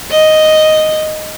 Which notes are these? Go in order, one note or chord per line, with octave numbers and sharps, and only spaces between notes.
D#5